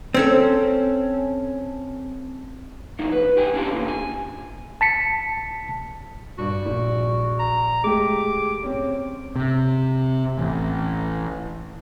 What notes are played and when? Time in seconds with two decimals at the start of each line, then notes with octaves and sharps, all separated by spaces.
0.14 C4 C#4 A4
2.99 B2 D3 D#3 F3 D#4
3.12 B4
3.36 C2 G4 G5 G#5
3.54 C#4 D4 F4 G4 A5 C6
3.71 E2 A#2 D3
3.88 G#5
4.81 A5 B6 C#7
6.38 G2 F#4 D5
6.66 A#1
7.40 A#5
7.84 G#3 A3 G4 D6
8.63 C4 C#4
9.36 C3
10.37 A1